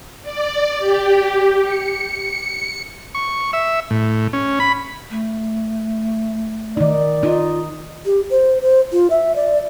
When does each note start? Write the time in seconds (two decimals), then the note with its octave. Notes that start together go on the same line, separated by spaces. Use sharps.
0.22 D5
0.79 G4
1.61 C#7
3.15 C#6
3.53 E5
3.90 A2
4.33 C#4
4.60 B5
5.11 A3
6.77 D#3 D#4 D5
7.23 D#4 F4
8.06 G4
8.31 C5
8.63 C5
8.92 F4
9.10 E5
9.36 D5